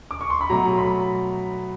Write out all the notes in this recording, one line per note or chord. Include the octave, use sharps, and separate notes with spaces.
D6
C#6
C6
B5
B2 F#3 A3 A#5
B5